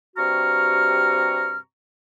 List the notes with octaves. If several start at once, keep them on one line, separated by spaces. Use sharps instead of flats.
G2 C3 F#4 A#5 C#6 F6